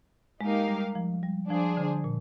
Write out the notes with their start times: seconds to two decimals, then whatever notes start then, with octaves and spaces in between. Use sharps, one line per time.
0.41 G#3 A#3 D#4 G4 A#4 F5
0.68 G3
0.95 F3
1.23 G3
1.49 F3 D4 G#4 C5
1.77 D3
2.04 A#2